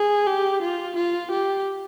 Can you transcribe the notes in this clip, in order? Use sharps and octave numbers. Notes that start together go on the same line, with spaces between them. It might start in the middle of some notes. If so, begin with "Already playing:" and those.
Already playing: G#4
G4
F4
F4
G4